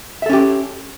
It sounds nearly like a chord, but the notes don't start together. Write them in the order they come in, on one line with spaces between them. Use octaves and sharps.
E5 A4 C#4 G4